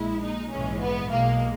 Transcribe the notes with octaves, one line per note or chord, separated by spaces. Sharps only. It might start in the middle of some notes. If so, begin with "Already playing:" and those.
Already playing: A#1 A#2 G#3 E4
D#4
A#1 G#2 E3 G#3 C#4
B3
B1 B2 G#3 A#3